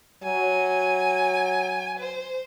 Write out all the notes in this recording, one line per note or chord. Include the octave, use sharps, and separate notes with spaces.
F#3 G#5
C5